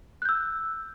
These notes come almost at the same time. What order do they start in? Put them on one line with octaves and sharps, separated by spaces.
F#6 G6 E6